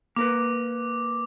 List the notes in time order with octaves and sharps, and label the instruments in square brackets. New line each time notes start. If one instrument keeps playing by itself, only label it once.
[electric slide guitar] A#3 A#4 B4 [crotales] D6